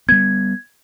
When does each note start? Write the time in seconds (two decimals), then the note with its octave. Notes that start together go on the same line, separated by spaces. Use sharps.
0.09 G3 B3 G#6